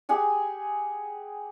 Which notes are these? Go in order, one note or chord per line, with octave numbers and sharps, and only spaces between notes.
G4 G#4 F#5 G#5